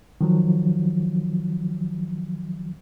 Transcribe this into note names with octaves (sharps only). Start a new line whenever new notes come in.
D#3 F3 F#3